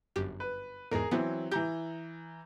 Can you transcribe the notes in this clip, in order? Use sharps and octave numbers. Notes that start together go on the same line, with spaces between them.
G1 F#2 G4
B4
E2 G#2 G#4 A#4
E3 F#3 B3 C4
E3 G4 A#5 G6